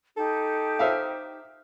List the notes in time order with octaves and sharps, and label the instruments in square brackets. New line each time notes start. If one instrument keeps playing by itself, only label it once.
[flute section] D#4 G4 [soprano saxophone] A4
[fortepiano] C5 E5 F5